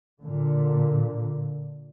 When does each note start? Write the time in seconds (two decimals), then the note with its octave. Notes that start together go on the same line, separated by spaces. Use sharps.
0.23 A#2 D3